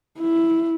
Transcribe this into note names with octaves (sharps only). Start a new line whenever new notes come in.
E4